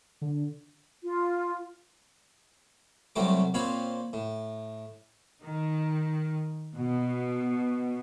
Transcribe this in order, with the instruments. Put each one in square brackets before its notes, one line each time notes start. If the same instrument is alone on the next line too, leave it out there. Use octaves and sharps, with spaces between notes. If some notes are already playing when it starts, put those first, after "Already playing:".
[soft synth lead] D3
[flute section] F4
[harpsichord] C2 C3 F#3 G3 A3 D6
A#2 C4 C#5 F5 B5
A2
[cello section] D#3
B2